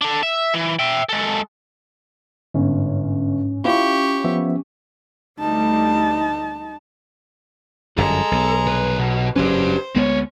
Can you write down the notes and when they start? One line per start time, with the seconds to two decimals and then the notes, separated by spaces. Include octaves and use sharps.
0.02 D4 A4
0.23 E5
0.54 E3
0.79 E5 G5
1.09 G#3 A4
2.54 G1 G#2 C#4
3.64 E4 F4 G4 C#6
4.24 F3 B3 E5
5.39 D2 G3 D#4 A5
7.98 G1 F#2 F#3 G#3 A4 A#5
8.31 B1
8.66 C2 B4
8.99 B2
9.36 F#1 F#3 C#4 G4 B4 C5
9.95 D2 G#3 B3 C4 C#5